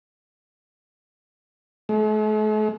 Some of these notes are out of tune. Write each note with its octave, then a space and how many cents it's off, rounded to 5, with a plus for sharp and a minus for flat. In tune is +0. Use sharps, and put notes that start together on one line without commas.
A3 -45